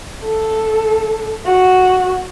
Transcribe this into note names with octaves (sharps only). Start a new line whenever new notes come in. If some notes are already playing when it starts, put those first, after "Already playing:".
A4
F#4